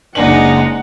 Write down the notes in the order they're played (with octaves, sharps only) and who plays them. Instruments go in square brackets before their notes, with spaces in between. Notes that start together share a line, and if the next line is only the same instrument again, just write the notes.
[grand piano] F#1 D4 F#7 [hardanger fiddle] G#3 D#4 [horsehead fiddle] F#5